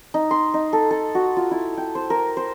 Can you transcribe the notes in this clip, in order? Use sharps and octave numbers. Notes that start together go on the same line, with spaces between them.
D#4
C6
D#4
A4
A4
F#4
F4
E4
G5
C5
A#4
C5